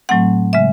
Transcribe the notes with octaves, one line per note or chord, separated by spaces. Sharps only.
A2 F#3 A3 C4 F#5
C#3 G#3 E5